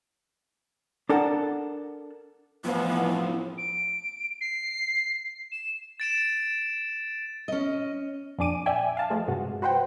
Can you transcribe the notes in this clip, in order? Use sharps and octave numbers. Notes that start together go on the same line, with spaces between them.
D4 A4 A#4 F#5 A5
F2 A2 E3 F3 B3
D7
C7
E7
A6 D7 E7
C#4 D#5
F2 A#2 D4 G#4 D6 D#7
D5 E5 G5 G#5
F5 A5
F3 G#3 A3 G#4
G2 C3 G#3 F#4
F#4 B4 C5 F#5 G5